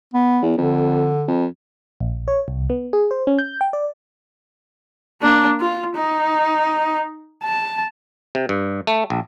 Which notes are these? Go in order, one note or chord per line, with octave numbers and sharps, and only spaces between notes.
B3
E2
F2 D3
F2
A#1
C#5
C2
B3
G#4
C5
C#4
G6
G5
D5
A#3 D4
F4
D#4
A5
C3
G2
A3
A#1